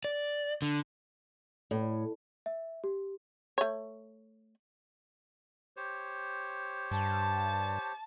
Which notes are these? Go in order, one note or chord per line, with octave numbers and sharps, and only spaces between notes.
D5
D3
A2
E5
G4
A3 C#5
G4 C5 C#5
G2 A5